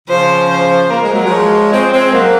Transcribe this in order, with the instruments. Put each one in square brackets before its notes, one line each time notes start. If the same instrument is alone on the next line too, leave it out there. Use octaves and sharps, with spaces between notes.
[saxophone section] C#3 F3 [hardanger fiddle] C5
[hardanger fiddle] C5
[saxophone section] A#3 [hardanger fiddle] A#4
[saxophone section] G#3
F#3
F3 G#3
[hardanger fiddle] C#5
[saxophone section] G#3 C4 [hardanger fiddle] C5
[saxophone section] G#3 C4
F#3 A#3